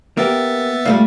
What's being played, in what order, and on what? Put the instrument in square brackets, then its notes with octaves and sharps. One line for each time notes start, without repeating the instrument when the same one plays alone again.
[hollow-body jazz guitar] A#3 G4 [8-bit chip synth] B3 E5 A6
[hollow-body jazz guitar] A#2 [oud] G3 A3 F5